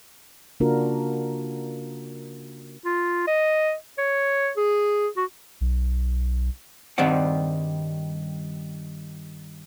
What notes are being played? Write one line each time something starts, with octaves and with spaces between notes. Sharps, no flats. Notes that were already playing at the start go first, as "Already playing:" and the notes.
C#3 A#3 D4 F4 F#4 A#4
F4
D#5
C#5
G#4
F#4
B1
G2 D#3 G3 C4 D5 F#5